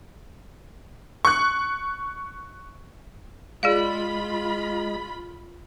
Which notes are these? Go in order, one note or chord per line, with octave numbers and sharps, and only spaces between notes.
C#6 F#6
G#3 F4 G#4 D5 F5 B5